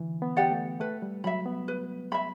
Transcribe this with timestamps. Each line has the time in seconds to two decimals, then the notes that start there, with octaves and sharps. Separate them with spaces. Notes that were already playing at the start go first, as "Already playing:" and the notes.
Already playing: D3 E3
0.22 B3
0.37 G4 D5 F#5
0.51 A3
0.80 A3 B4
1.02 G3
1.24 F#3 E5 B5
1.46 B3
1.68 B4
2.12 E5 B5